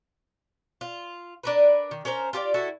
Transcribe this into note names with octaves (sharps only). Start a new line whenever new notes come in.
F4
D4 A#4 B4
D#3
C#4 A#4 C5 A#5
F4 G4 C5 D5
E4 F#4 A4